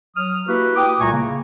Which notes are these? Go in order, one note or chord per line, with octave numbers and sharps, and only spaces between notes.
F#3 D#6 F6
A#3 E4 F#4 G4 B4
G5 D6 D#6
C2 A#2 A3 G#5 A#5 C#6
C#3 A#3